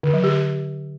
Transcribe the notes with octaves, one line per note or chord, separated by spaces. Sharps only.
D3
F#3
G4